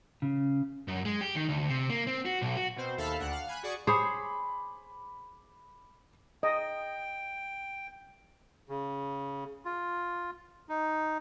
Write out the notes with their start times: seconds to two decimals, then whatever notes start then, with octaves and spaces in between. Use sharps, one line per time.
0.22 C#3
0.88 F#2
1.05 G#3
1.21 G4
1.35 D#3
1.49 D2
1.69 C3
1.90 A#3
2.07 C4
2.25 F#4
2.42 B1
2.57 F#4
2.76 B2 C4 C5
2.97 D#2 A4 E5 F5 B5
3.20 D2 D4 F#5
3.32 F5
3.48 G#5 B5 F#6
3.63 F#4 G#4 D5 C#6
3.87 G#4 C5 C#5 B5 D6
6.43 D#5 G5
8.69 C#3
9.65 F4
10.69 D#4